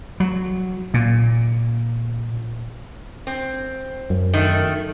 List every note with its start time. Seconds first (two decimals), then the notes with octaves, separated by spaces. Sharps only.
0.20 F#3
0.94 A#2
3.27 C4
4.10 F#2
4.34 D#3 A3